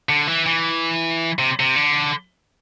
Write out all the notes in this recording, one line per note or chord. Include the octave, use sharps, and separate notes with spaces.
D3
E3
E3
C3
C3
D3